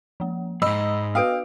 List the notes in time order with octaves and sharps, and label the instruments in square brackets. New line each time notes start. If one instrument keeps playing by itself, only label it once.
[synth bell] F3 A#3
[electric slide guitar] F2 G#2 [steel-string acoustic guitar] D#5 [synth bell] B5 [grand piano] E6
[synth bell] B3 F#4 B4 [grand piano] F5 D#6 D7